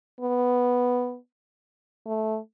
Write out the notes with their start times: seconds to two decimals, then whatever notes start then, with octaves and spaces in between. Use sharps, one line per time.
0.21 B3
2.06 A3